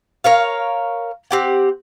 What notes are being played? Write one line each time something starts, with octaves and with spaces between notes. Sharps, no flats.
A#4 C#5 F5
C4 G4 F#5